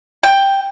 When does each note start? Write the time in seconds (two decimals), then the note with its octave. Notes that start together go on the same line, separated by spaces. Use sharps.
0.23 G5